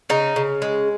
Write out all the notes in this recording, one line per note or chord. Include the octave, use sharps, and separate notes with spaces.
C#3 D#4
C#3
G#3